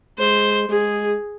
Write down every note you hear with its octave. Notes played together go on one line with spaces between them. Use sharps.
G#3 C5
G#3 G#4